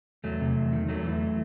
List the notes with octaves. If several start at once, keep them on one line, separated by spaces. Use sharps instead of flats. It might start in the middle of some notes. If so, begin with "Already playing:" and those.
E2 F#3 A3
C3
E2
D#3
E2 F#3 A3
E3